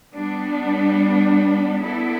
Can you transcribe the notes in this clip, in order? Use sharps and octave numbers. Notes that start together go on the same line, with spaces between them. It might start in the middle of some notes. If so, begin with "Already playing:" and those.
G3 B3 D4
B3 E4 A4 D5